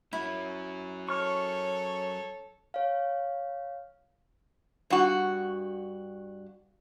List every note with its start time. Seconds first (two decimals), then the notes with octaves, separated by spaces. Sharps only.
0.13 F#3 C#4 E4
1.09 A4 C#5 C#6 F6
2.74 C#5 F5
4.90 G2 F#4